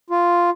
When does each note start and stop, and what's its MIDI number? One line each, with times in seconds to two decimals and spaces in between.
0.10 0.50 65